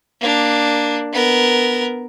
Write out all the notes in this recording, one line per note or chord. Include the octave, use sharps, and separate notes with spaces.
A#3 D4
B3 A#4